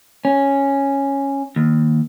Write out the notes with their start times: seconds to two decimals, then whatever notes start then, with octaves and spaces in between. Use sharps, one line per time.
0.25 C#4
1.56 D#2